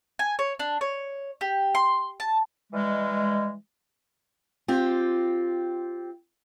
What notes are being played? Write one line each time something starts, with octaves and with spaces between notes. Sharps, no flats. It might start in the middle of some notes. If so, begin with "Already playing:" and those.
G#5
C#5
D4
C#5
G4
C6
A5
E3 G3 G#3
C4 F4 G4